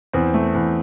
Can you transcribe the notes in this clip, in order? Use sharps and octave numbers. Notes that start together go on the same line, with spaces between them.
E2 C4
A3
E2